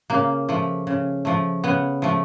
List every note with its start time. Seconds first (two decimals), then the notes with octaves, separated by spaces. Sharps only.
0.10 C#3 A#3
0.49 F3 A3
0.87 C#3
1.25 F3 A3
1.64 C#3 B3
2.02 F3 A3